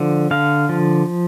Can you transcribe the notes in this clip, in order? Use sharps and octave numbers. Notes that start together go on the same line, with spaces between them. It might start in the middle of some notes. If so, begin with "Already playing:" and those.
Already playing: D3 F3
D3 F5
F3